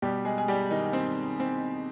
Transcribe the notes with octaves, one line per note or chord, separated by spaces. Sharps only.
B2 G3 G4
G#3 G#4
G#4
G3 G4
D#3 D#4
C4
C4